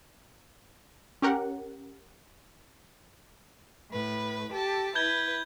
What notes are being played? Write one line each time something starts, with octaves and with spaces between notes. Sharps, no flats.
C#4 G4 A#4 F#5
A2 B4
G4 A4 A5
E4 B4 G6 G#6 G7